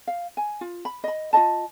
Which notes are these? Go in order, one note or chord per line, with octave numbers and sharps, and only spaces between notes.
F5
G#5
F4
B5
D#5 B5
F4 D5 D#5 A5